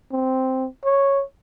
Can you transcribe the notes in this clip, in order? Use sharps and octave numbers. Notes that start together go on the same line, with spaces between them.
C4
C#5